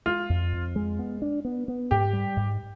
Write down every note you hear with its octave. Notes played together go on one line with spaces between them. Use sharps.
G#3 F4
F2
F2
G#3
B3
D4
B3
B3
G#2 G4
G3
G#2